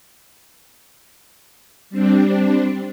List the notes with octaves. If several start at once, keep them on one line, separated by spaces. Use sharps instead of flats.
G3 C4 D4